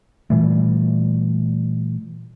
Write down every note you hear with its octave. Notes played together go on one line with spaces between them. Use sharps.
A#2 E3 G3 A3